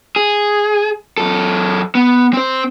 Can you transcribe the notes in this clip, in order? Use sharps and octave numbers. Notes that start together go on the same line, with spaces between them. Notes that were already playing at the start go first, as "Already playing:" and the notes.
G#4
F#2 A4
B3
C4 C5